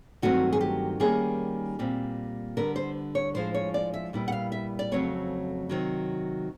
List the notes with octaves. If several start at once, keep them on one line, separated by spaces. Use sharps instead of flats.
G2 D#3 F#3 A3 C4 F#4
G#4
G4
D#3 G3 A#3 C#4 G#4
A#2 G3 C4
D3 G3 B3 A#4
C5
C#5
A2 F3 G#3 C5
C#5
D5
E5
A#2 G3 B3 E4
F#5
F5
E5
D5
F2 C#3 F#3 A3 C4 C#5
C3 D#3 F#3